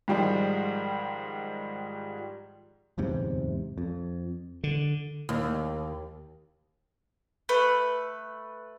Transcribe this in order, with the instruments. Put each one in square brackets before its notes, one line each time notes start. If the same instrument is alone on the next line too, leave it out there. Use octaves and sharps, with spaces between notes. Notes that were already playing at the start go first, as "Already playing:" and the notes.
[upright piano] G#2 D#3 F3 G3 G#3
[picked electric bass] D1 E2 G#2 C3
F2
[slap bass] D3
[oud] D#2
[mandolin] A3 B4